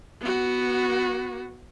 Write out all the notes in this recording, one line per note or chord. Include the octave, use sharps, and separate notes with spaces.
B3 F#4